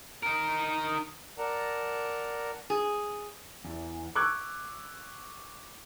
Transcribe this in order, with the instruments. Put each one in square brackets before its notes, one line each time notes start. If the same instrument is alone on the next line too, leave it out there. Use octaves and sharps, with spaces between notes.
[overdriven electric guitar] D#4 A#4
[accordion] A#4 D5 F#5 A5 A#5
[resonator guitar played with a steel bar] G#4
[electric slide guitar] E2
[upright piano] C#6 D6 E6 F#6 G#6 D7